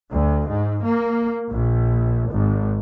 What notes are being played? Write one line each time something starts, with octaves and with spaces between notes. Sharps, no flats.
D2
G#2
A#3
A#1
G#1